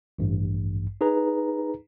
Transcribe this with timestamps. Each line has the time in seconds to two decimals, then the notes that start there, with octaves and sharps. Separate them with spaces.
0.19 A1 G2
1.01 D#4 G#4 B4 A#5